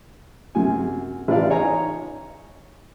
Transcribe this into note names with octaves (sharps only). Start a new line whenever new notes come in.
F#2 C3 G#5
A1 F4 D5 F5
D#4 C#5 G#5 A#5